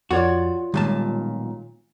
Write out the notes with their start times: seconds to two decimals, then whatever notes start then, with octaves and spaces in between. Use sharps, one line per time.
0.11 F2 F4 F#4 C#5 D5
0.74 B1 A#2 D#3 G3 G#3 A5